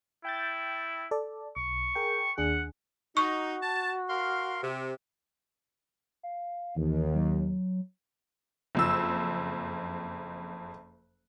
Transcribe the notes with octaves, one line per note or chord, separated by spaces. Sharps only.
E4 G5 G6 A6
A4 D5
B1 C#6
G#4 A#4 G5
D#2 D4 G#4 F#5
D#4 F#4 C#6
A5
A#4 F5 C6
C3
F5
D#2 E3
F#3
F#1 F2 E6